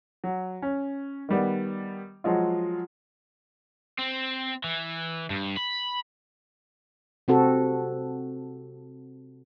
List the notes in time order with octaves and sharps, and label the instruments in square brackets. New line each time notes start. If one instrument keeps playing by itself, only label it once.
[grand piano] F#3
C#4
D#3 G3 B3
F3 F#3 G#3 F4
[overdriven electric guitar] C4
E3
G2
B5
[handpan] C3 C4 F#4 A4